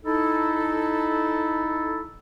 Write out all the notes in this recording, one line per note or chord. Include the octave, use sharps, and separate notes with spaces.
D#4 E4 A4